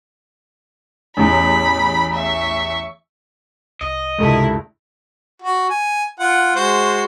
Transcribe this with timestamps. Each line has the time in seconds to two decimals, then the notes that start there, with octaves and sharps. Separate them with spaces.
1.17 A1 E2 B5
2.13 E5 C#6
3.81 C2 D#5
4.18 C#2 G2 C3 G#3 E4 A4 A#4
5.42 F#4
5.70 G#5
6.20 F4 F#5
6.56 G#3 F#4 C5